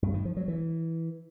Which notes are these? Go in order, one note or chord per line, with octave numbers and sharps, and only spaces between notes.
G2
D#3
F3
F#3
E3